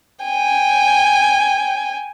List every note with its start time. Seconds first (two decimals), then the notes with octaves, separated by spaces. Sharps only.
0.24 G5 G#5